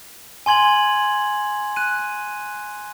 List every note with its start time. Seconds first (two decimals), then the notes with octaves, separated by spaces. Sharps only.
0.46 G#5 C6 G#6 F#7
1.76 F#6 D#7